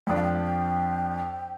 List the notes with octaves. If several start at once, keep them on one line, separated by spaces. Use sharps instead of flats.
F2 F3 D4 G5
F5
G5